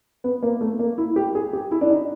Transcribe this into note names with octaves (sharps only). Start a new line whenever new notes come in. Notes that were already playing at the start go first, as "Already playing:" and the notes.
B3
A#3
A3
A#3
E4
G4
G#4
G4
E4
D4
D#4